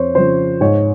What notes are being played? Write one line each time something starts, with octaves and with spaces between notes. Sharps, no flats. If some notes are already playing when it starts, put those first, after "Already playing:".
Already playing: F2 C5 C#5
C#3 F3 C5
G#2 C#5